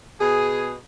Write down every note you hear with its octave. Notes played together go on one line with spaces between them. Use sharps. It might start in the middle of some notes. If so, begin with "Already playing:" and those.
B2 G#4